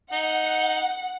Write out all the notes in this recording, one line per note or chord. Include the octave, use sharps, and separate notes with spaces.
D#4 F#5